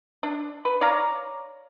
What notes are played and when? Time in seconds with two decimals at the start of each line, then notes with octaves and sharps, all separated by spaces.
0.23 D4
0.65 B4
0.81 C#5 D5 F5 A#5